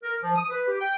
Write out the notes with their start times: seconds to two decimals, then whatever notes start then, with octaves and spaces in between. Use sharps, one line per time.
0.03 A#4
0.23 F3
0.36 D#6
0.50 B4
0.68 G4
0.80 G5